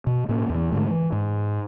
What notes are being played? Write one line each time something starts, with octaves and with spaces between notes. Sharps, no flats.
B2
A2 A#3 C#4
E2 E3
G#2 D3 A3
E3
G#2